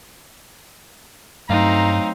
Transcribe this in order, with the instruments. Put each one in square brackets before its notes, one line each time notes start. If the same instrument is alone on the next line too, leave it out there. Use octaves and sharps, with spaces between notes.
[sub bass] G2 [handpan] F#3 A3 [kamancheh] C4 D#4 [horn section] F5 A#5